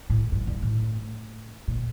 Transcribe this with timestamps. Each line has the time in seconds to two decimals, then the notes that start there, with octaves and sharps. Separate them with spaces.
0.10 A2
0.32 G2
0.47 G2
0.63 A2
1.68 A#2